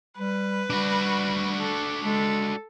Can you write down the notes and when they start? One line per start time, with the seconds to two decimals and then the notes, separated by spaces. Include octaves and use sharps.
0.18 G3 B4
0.70 G3 D4 F#4
1.58 A4
2.03 G#3 A4